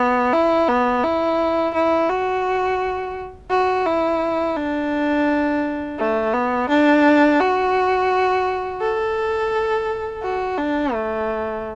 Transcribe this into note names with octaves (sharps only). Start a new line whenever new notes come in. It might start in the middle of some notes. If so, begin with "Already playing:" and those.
Already playing: B3
E4
B3
E4
E4
F#4
F#4
E4
D4
A3
B3
D4
F#4
A4
F#4
D4
A3